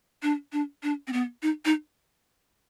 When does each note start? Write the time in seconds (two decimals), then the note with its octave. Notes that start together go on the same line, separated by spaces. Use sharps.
0.23 D4
0.53 D4
0.83 D4
1.07 C4
1.13 B3
1.43 D#4
1.65 D#4